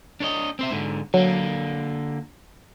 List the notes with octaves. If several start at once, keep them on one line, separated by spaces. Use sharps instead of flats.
D4 C#5 D#5
C4 C5 E5
G#2 D3
D3 F#3 A#3